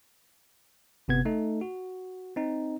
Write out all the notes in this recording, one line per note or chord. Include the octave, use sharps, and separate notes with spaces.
G1 C3 B3 G#6
A3 D#4 A4
F#4
C4 D#4